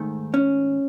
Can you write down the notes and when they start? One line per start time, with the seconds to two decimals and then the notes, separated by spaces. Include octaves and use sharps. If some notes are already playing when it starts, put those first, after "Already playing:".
Already playing: G#2 D#3 A3
0.34 C#4